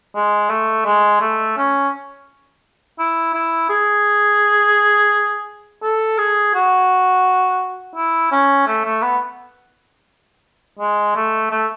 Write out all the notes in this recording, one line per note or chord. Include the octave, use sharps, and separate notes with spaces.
G#3
A3
G#3
A3
C#4
E4
E4
G#4
A4
G#4
F#4
E4
C#4
A3
A3
B3
G#3
A3
A3